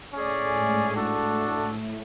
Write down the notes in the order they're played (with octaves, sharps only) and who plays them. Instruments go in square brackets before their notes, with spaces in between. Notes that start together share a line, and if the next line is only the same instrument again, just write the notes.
[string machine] A2 A3 [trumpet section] C#4 G#4 D5
[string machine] G#2 G#3
[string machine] A2 A3 [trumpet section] D4 F#4 A4